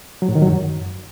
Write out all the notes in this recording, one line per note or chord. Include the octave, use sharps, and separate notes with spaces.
F#3
A2
D#3
F#3
F#2